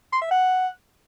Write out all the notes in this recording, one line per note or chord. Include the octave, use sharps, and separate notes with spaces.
C6
E5
F#5